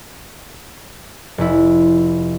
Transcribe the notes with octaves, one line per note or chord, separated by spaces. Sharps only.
F1 E4